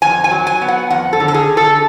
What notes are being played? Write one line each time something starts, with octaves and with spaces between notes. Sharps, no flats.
F2 G#5
G#5
F#3
G#5
B3
F#5
F2 F#5
A4
D3
A4
G#4
D3
A4